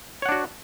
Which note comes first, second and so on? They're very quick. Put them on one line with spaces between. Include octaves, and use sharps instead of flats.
C#5 F#5 D4 F#4